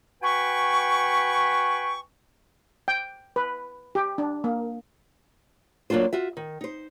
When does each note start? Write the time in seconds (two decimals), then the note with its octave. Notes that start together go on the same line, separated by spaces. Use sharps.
0.23 F#4 B4 G5 G#5 B5 C#6
2.88 G5
3.36 B4
3.95 G4
4.18 D4
4.44 A#3
5.90 F#3 A#3 D4 F4 C5
6.13 F4 F#4 E5
6.37 D#3
6.61 D#4 C5